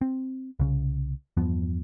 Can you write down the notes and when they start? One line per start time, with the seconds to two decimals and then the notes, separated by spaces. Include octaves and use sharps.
0.01 C4
0.59 C2 C#3
1.37 E2 G2 F3 B3